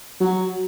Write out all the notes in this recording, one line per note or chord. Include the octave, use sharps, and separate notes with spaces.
F#3